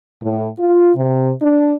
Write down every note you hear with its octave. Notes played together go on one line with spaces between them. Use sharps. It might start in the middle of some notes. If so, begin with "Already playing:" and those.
A2
F4
C3
D4